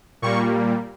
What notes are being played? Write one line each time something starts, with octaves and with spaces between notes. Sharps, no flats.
A#2 G3 A#3 C#6